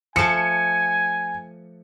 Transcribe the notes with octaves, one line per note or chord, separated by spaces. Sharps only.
F3 A3 G#5 C#7